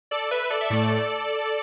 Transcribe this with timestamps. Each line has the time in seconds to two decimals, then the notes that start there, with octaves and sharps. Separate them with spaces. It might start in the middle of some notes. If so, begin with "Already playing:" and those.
0.11 A4 D5
0.31 B4 E5
0.50 A4 D5
0.61 E5
0.70 A2 A3 A4 D5